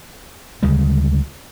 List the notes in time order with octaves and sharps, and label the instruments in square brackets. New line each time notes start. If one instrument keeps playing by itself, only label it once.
[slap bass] D2 C#3 G3 G#3